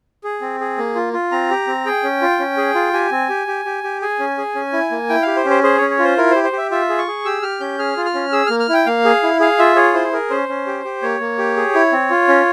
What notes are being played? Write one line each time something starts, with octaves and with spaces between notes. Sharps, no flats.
G#4
C4
G#4
A#3
F4
F4
C4 A#5
G4
C4
G#4 G5
C#4
F4
C#4
G#4
F4
G4 G#5
C4
G4
G4
G4
G4
G#4 G#5
C#4
G#4
C#4
E4
A#3
E4 G5
F5
G4
C5
C#4
C5
G#4 C5
C#4 C#5
C#5
F4
C5
E4 A#4
C5
G4
C5
G4 E5
F4 E5
G#4
C#6
G#4
G4 E6
G4 F6
C#4 G6
G#4 F6
F4
F6
C#4
G#4 E6
A#3 F6
F6
E4 G5
A#3 F5
G#4
E4
G#4 F5
F4 E5
G#4 C#5
E4 C5
G#4 A#4
C#4 C5
C#4
G4
G4
A#3 C#5
A#3
G4
G#4
E4
C4
F4
C#4